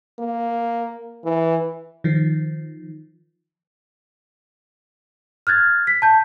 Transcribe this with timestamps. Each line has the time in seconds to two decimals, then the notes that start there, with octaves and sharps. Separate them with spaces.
0.19 A#3
1.24 E3
2.04 D#3 F3
5.47 F6 F#6 G#6 A6
5.87 B6
6.02 A5 G6